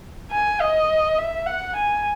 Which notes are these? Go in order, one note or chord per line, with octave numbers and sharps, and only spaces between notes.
G#5
D#5
E5
F#5
G#5